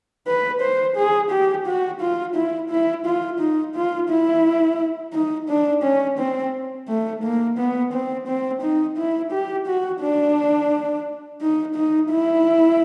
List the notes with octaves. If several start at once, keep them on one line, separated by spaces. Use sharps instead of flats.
B4
C5
G#4
G4
F#4
F4
E4
E4
F4
D#4
F4
E4
D#4
D4
C#4
C4
A3
A#3
B3
C4
C4
D#4
E4
G4
F#4
D4
D#4
D#4
E4